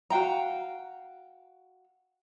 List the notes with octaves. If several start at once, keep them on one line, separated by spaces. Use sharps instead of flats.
F#4 F5 G5 A#5